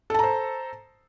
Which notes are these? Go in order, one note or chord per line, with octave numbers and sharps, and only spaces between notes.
A4 C5 A5 A#5